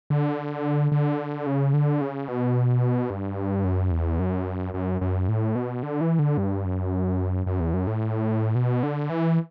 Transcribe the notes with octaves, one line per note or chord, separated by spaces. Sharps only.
D3
D3
C#3
D3
C#3
B2
G2
F#2
E2
F#2
F#2
F#2
A2
B2
D3
E3
D3
G2
F#2
F#2
E2
F#2
A2
B2
D3
E3